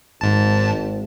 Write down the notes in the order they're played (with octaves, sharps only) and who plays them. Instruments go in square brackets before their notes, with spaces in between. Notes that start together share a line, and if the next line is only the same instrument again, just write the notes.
[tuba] G#1 [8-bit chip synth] G#2 A5